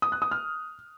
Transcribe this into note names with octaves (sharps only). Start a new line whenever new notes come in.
D#6
F#6
D#6
F6